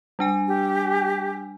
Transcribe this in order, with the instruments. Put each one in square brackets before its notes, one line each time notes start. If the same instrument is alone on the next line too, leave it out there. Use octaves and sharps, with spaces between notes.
[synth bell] G3 D4 G#5
[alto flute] G4